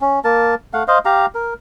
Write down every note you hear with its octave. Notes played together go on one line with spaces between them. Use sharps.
C#4
A#3 A#4 A5
A3 F5 F#5
C5 D#5 F5
G4 F5 A#5
A#4